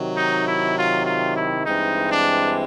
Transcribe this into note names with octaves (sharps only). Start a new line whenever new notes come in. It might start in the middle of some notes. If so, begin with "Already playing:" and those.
Already playing: C3 D#3 F#3
D#4
E4
F4
F4
E4
G2 E3 G#3 C4 D#4
D4